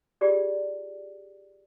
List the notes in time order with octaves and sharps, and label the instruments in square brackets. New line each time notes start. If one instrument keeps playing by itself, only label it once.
[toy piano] F4 G4 G#4 D5